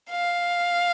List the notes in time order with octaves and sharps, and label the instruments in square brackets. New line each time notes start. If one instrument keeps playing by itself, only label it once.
[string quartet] F5